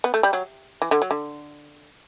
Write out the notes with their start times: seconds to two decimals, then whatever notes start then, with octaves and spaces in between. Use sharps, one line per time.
0.04 B3
0.14 A3
0.23 G3
0.33 F#3
0.82 E3
0.91 D3
1.02 F#3
1.11 D3